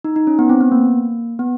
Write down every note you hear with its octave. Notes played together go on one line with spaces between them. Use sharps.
D#4
D#4
C#4
B3
C4
B3
A#3
B3